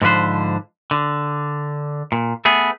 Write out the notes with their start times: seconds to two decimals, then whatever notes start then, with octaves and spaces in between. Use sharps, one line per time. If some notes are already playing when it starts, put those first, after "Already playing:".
0.02 G#2 D3 F3 B4 C5
0.91 D3
2.12 A#2
2.45 A3 B3 G#4